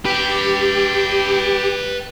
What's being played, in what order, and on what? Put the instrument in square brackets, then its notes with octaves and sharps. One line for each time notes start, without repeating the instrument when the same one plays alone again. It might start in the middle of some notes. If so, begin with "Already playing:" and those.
[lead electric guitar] G4 [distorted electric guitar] B4 G5